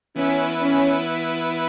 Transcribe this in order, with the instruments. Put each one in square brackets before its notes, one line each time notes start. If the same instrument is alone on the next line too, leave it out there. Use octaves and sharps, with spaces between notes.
[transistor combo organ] E3 B3 E4 B4 [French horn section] C#4
[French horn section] C#4